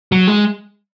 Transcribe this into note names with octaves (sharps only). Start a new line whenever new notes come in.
F#3
G#3